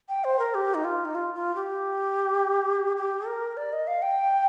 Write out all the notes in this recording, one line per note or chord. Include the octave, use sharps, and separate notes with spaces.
G5
C5
A#4
G4
D#4
F4
D#4
F4
F4
G4
G4
A#4
D5
D#5
F5
G5